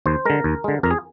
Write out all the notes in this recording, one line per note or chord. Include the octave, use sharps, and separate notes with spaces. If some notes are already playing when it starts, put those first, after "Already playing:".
D#2 C5
D3 G#3 A#4
D#2
D3 G#3
F2 A#4
G#4